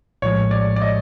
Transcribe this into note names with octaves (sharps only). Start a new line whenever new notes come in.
A#1 A2 F3 G#3 C#5
D5
D5
D#5